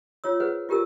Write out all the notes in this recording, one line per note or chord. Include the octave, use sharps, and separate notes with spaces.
F4 C#5 E6
G#4 B4 C5 F#5
F4 G4 A#4 A5 E6